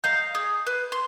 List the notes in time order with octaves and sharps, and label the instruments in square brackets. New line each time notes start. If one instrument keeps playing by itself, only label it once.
[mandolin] D#5 F5 A#5 [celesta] G6
[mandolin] G#4
B4
C6